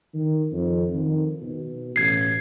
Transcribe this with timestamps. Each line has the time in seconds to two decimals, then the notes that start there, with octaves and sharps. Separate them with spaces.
0.14 D#3
0.52 F2
0.94 D#3
1.42 B2
1.96 A1 G#6 C7